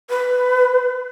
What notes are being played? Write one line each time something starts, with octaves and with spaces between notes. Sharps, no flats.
B4